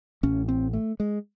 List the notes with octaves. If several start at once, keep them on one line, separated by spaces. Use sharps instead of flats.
A1 A2 C#4
C4
A3
G#3